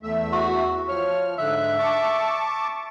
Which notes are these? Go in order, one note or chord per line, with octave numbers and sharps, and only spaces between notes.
E2 A3 E5
F#4
F3 C#5 F6
G#2 D3 E5 F#6
A5 C#6 D6